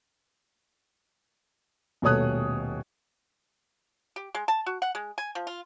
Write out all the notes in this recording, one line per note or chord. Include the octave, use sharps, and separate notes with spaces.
D#1 B2 A3 C#5 D#6 F#6
G4
G#3
A5
F#4
F#5
G#3
G#5
F3
F4